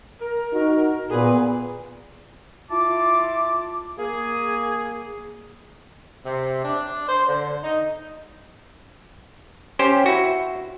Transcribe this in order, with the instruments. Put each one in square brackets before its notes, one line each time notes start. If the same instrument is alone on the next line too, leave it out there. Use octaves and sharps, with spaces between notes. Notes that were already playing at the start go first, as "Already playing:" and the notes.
[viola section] A#4
[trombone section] D#4 F#4
[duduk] A#2 [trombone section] B3 [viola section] G#4 B4
[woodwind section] E4 F4 A5 D6
A#3 G#4
[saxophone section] C3
D4
C5
D3
D#4
[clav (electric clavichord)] C#4 G4 C5 G5
E4 F#4